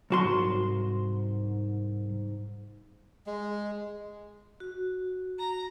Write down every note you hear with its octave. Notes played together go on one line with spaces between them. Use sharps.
C2 F#3 F#4 C6
G#2
G#3
F#4
A#5